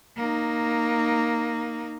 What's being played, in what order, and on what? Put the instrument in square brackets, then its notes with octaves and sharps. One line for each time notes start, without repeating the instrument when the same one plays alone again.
[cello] A#3 D#4